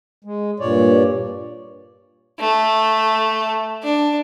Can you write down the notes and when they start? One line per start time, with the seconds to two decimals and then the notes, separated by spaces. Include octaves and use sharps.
0.24 G#3
0.60 G2 A#2 C#5 D5
2.39 A3
3.83 D4